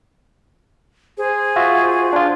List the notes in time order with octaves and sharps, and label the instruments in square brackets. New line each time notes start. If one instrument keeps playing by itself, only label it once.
[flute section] G#4 C5
[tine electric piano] F4 F#4 E5
D4 F4